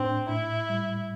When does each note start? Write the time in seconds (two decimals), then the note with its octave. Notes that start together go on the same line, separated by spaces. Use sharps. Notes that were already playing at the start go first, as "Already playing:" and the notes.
Already playing: A2 C4 D4
0.29 A2 E4
0.70 G3